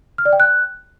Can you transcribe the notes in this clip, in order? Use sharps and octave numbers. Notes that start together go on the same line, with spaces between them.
F6
D5
G5
F#6